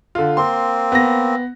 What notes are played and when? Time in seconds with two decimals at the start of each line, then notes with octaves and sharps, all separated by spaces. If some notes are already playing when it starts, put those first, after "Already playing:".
0.15 D3 F4
0.37 A#3 C4 C6
0.92 B3 A#6